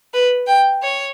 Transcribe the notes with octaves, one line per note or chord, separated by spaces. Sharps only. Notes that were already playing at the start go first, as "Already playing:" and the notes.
B4
G5
C#5